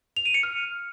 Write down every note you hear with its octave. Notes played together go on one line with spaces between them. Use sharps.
F7
D#7
C#7
F6